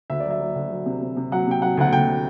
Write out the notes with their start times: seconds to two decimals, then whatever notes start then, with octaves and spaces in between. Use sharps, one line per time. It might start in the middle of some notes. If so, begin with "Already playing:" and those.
0.10 D2 E5
0.20 D5
0.25 F#3
0.30 E5
0.40 F#3
0.56 D2
0.71 F#3
0.86 C3
1.01 C3
1.17 C3
1.32 F#3 F#5
1.47 C3 G5
1.62 F#3 F#5
1.77 D2 F#5
1.93 D2 G5